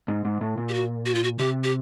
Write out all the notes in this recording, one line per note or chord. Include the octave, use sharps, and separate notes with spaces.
G#2
G#2
A2
A#2
G4
F#4
F#4
F4
F#4
C3 G4
G4